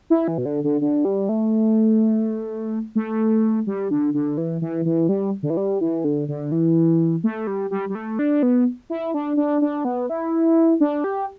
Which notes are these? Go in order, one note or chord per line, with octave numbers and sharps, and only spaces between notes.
E4
E3
B2
D3
D3
D3
G3
A3
A3
G3
D3
D3
E3
E3
E3
G3
D3
E3
G3
E3
D3
D3
E3
A3
G3
G3
G3
A3
D4
B3
E4
D4
D4
D4
B3
E4
D4
G4